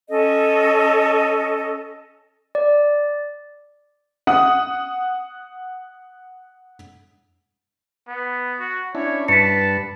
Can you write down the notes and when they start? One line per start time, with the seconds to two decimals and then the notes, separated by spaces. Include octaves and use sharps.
0.09 C#4 A4 D#5
2.55 D5
4.27 F#5 D#6
8.07 B3
8.60 F#4
8.95 C#4 D4 E4 C#5
9.28 G2 B4 A5 B6 C#7